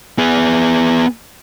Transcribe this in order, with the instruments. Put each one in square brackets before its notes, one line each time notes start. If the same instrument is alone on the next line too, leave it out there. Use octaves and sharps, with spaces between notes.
[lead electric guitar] B3 G#4